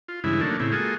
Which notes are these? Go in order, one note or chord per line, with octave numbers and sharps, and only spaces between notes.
F4
G2 C#3 E3 G#3 E4
D#3 F#3 A3 A#3 D4
A2 C#3 C4 E4
G#3 A#3 F4 F#4 G#4 A4